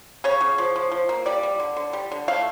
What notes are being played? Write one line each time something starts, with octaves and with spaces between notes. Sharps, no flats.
C#3 C#5
C#3
F3
F3
F3
A#3
G3 D5
G3
D3
D3
G3
D3
A3 F5